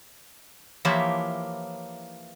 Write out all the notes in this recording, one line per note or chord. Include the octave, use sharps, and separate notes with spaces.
E3 F3 A#3 G4 C#5 E5